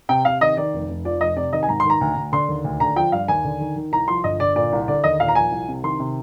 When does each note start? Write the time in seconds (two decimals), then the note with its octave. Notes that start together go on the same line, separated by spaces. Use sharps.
0.09 C3 G5
0.25 C3 F5
0.41 D#3 D#5
0.57 D#3 D5
0.73 F1
0.88 F1
1.05 F3 D5
1.21 F1 D#5
1.37 C3 D5
1.53 D#3 D#5
1.63 G#5
1.68 G#2 A#5
1.80 C6
1.85 D#3 A#5
2.01 D2
2.16 D2
2.33 D3 C6
2.48 D#2
2.64 D2
2.80 D3 A#5
2.96 F3 G5
3.12 G2 F5
3.28 D#2 G#5
3.44 D3
3.60 D#3
3.76 D#3
3.92 C2 A#5
4.08 F3 C6
4.24 G1 D#5
4.40 D3 D5
4.56 A#2 D5
4.72 C2
4.88 D3 D5
5.04 D#2 D#5
5.20 A#2 F5
5.28 A#5
5.35 F3 G#5
5.51 C2
5.68 C3
5.83 D#3 C6
5.99 C3